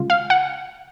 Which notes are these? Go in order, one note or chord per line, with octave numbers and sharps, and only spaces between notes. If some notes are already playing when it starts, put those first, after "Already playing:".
Already playing: C#3 G#3 F4
F5
F#5